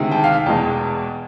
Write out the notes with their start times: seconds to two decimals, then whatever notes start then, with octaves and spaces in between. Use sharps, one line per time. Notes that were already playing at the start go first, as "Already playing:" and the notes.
Already playing: D2 C3 D#3 G#3
0.11 G5 A5
0.24 F5 G5
0.46 E2 B2 G#3 G5 A5